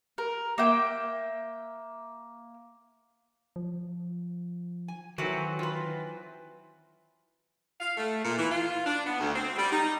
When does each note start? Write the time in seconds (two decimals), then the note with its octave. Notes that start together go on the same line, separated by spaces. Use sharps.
0.18 A#4
0.58 A#3 E5 G5
3.56 F3
4.88 G#5
5.18 D#3 E3 F#3 C4 F#4 A4
5.59 F4 B4
7.81 F5
7.97 A3
8.25 A#2
8.38 E3
8.50 F4
8.86 D4
9.06 B3
9.20 D2
9.36 C4
9.57 G3
9.72 D#4